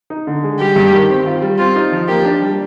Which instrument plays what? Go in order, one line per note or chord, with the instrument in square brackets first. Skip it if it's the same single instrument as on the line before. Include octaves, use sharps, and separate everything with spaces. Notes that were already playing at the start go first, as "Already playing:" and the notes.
[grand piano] D#4
D3
G#3
[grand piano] G3 [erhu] G4
[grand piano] G2
D#3
C4
F4
G3
[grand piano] C4 [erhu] F4
[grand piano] D#4
F3
[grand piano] A#3 [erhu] G4
[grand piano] D4
G3